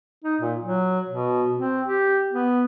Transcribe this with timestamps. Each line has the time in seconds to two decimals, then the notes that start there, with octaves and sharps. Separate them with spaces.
0.24 D#4
0.40 A#2
0.61 F#3
1.09 B2
1.57 C4
1.86 G4
2.32 B3